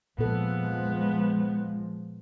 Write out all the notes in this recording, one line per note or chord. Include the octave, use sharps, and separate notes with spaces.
A#2 F3 G#3 B3 A4